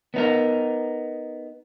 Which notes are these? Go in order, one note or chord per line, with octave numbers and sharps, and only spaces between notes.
B3 D#4 A#4